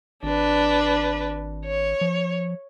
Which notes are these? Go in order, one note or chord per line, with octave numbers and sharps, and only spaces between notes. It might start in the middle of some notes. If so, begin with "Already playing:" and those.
G#1 D4 B4
C#5
F3